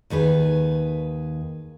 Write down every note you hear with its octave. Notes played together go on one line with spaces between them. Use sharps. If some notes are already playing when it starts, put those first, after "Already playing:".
D#2 D#3 G#4 B4